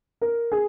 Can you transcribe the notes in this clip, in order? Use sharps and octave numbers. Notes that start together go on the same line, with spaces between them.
A#4
G#4